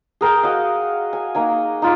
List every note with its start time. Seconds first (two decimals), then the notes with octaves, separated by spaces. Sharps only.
0.21 G#4 A#4 G5
0.43 F#4 D#5 F5
1.13 G#5
1.35 A#3 D#4 G#5
1.82 D#4 F4 D6